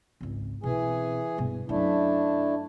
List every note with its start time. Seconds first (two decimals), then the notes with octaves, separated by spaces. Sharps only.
0.21 G#1 C#2
0.64 B2 E3 C4 G#4 G#5
1.38 G2 B2
1.69 F#2 A3 D4 E4